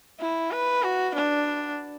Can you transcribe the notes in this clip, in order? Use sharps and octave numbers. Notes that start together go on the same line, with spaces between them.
E4
B4
F#4
D4